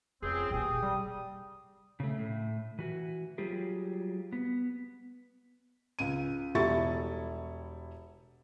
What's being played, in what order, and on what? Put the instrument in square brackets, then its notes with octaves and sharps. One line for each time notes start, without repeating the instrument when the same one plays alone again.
[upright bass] F1 [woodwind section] C#2 C4 [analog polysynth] G#4
[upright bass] E1 A#2 [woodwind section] G4 G5 D#6
[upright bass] C3 [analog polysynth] G3
[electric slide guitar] C#3 A3
A2
E3 F#4
F#3 G3 F4 G4 G#4
B3
[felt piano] C#2 D#7
E1 G3 E4 A4 C#6 A6